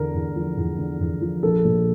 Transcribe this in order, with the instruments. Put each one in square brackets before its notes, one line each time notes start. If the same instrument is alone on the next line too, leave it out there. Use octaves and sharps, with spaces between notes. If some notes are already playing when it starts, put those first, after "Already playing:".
Already playing: [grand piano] E2 D3 A#4
E2
F3
E2
D3
E2
F3
A#1 A4
A#2